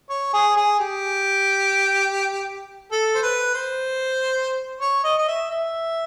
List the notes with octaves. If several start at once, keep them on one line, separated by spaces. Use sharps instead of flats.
C#5
G#4
G#4
G4
A4
C5
B4
C5
C#5
D#5
D#5
E5
E5